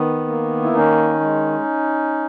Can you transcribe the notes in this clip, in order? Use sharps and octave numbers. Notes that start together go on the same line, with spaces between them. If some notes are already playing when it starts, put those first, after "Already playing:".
Already playing: D#3 B3
A#3
E4
D#3 C#4 D#4
G#3